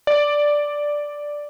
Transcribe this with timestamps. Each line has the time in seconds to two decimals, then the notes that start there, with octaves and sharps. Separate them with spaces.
0.07 D5